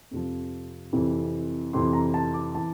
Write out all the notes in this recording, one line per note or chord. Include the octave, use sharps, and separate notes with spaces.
F2 C3 F3
F2 C3 E3
F2 C3 E3 C6
A#5
A5
D6
E3 A5